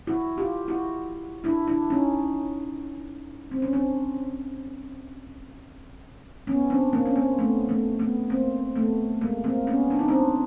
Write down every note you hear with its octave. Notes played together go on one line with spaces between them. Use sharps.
E4 F#4
F4 G4
E4 F#4
D4 E4
D4 E4
C#4 D#4
C4
C#4
C4 D4
B3 C#4
C4 D4
A#3 C4
C#4
A#3 C4
A3 B3
A3 B3
A3 B3
A#3 C4
A3 B3
G#3 A#3
A#3 C4
B3 C#4
D4
D#4
C4 D4